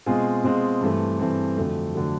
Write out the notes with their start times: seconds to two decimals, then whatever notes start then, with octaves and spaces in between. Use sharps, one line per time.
0.06 B2 G#3 C4 F4 G#4
0.44 B2 G#3 C4 F4 G#4
0.81 G2 E3 A3 C4
1.20 G2 E3 A3 C4
1.57 F2 D3 F#3 A3
1.95 D3 F#3 A3